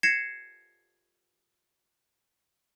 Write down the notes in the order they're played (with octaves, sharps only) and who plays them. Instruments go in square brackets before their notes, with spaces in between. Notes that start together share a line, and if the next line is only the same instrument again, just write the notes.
[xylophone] G#6 A#6 C7 C#7 E7